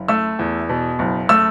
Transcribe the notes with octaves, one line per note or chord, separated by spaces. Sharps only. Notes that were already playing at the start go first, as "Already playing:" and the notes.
Already playing: F#1
A3 E6
E2
B2
F#1
A3 E6